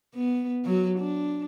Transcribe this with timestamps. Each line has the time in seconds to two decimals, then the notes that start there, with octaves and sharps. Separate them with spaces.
0.15 B3
0.65 F#3 F#4
0.99 D4